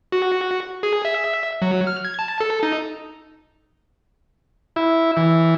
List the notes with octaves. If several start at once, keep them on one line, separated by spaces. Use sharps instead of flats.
F#4
G#4
E5
F#3
F6
G#6
A5
A4
D#4
E4
E3